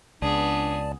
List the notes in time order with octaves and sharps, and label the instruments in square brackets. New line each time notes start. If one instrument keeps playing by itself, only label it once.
[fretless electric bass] C#2 [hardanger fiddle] B3 G#4 [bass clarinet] D4 [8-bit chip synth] D5 A5